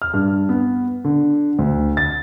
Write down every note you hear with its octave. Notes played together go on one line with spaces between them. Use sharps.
F6
G2
B3
D3
D2
A6